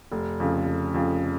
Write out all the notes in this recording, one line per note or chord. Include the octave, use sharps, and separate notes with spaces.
F1
F2 C#3
F1
F2 C#3